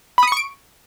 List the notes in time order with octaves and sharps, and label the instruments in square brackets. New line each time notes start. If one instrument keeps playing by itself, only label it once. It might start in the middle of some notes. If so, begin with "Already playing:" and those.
[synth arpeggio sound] B5
D#6
C#7
C#6
D7